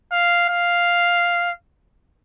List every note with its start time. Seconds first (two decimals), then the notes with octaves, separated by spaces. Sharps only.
0.12 F5
0.49 F5